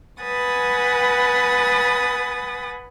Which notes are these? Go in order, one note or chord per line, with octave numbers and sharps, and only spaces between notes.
B4 F#5 G#5 B5 D#6 A6